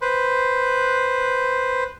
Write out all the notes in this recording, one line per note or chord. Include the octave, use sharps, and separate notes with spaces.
B4 C5